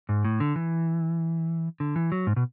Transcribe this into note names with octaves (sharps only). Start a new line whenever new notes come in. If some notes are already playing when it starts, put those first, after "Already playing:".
G#2
A2
D3
E3
D3
E3
F#3
G#2
B2